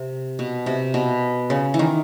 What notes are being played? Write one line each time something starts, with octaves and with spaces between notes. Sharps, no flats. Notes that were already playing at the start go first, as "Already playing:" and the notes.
Already playing: C3
B2
C3
B2
C#3
E3
D#3